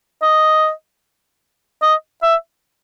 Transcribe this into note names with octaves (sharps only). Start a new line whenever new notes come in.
D#5
D#5
E5